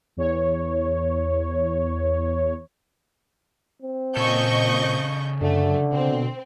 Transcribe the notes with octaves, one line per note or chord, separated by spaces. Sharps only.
E2 C#5
C4
A#2 C#3 A4 D#5 C#6 G6
F#2 D3 A3
B2 C4